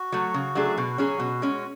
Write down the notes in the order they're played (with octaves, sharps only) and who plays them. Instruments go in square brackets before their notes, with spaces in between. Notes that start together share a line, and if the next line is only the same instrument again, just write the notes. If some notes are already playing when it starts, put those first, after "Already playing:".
Already playing: [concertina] F#4
[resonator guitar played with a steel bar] F#3 A3
C#3
F#3 A3 D4 G#4
[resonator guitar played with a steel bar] B2 [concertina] F#4
[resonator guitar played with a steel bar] F#3 C#4 G#4
B2
G#3 C#4